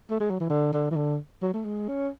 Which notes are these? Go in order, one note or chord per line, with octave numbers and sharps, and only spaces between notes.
A3
G#3
F#3
E3
D3
D3
E3
D3
F#3
A3
G#3
C#4